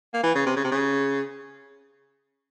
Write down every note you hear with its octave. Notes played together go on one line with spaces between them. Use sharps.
A#3
E3
C#3
C3
C#3
C3
C#3